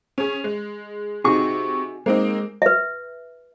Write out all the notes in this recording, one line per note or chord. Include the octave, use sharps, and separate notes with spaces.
C#4 G#4
G#3
C3 D#4 F#4 G#4 C#6
G#3 A#3 C4 D#4
B4 E5